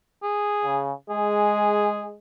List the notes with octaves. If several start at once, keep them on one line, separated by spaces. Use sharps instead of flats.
G#4
C#3
G#3 G#4